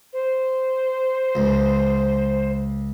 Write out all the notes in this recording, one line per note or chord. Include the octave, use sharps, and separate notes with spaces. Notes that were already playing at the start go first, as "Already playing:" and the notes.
C5
C#2